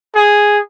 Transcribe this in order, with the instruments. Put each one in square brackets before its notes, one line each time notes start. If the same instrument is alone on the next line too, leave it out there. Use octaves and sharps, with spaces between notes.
[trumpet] G#4